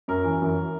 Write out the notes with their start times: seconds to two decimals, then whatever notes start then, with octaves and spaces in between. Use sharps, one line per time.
0.08 F#2 A#4
0.25 E3
0.41 F#2